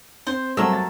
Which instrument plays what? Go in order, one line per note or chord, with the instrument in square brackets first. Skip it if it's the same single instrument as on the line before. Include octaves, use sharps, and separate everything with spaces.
[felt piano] C4 [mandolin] C5
[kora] F#3 A3 A#4 [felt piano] G3 C4 [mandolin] E6
[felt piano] A6